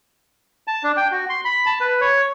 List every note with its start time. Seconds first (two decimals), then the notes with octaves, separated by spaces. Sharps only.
0.67 A5
0.83 D4
0.97 G5
1.12 F#4
1.29 C6
1.45 B5
1.66 A5
1.81 B4
2.01 C#5